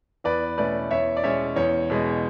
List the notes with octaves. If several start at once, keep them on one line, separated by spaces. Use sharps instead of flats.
E2 B4 D5
B2 A3 C#4 B4 D5
E2 C#5 E5
D5
B2 G#3 C#4 C#5 E5
E2 C#5
B2 G#3